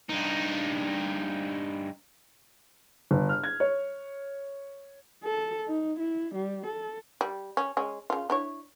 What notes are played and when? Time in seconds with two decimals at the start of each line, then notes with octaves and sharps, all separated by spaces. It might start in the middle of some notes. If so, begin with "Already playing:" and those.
0.09 G2 D#4
3.11 G1
3.29 F6
3.43 G#6
3.60 C#5
5.24 A4
5.67 D#4
5.99 E4
6.35 G3
6.66 A4
7.21 G3
7.57 C#4
7.77 G#3 C#4
8.10 C#3 F4
8.30 D4 E4 C#5